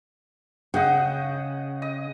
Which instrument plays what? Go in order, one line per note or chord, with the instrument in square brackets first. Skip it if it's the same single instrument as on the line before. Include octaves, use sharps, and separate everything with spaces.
[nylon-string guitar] C#3 [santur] D#5 F#5 G5
[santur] D#5